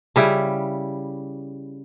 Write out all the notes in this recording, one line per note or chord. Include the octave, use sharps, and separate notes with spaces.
C#3 G3 E4